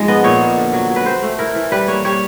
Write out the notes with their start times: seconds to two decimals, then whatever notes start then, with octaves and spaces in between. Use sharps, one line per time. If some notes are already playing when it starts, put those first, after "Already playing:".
Already playing: G#2 F3 G#3
0.08 B3 D#5
0.24 A#2 C#5
0.41 A#3
0.57 D3
0.73 F#3
0.90 F#3
0.96 B4
1.06 C4 C5
1.22 A3
1.39 E4 A#4
1.55 E3
1.72 G3 B4
1.88 A#3 C#5
2.05 G3 C#5